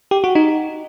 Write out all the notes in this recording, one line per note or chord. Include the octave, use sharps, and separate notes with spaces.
G4
F#4
D#4